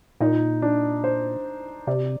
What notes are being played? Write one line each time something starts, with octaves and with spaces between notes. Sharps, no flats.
A#2 D#4
D4
C5
C3 D5